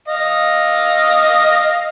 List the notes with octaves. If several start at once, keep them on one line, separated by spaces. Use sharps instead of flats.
D#5 F5